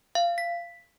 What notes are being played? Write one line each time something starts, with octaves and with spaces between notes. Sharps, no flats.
F5
B6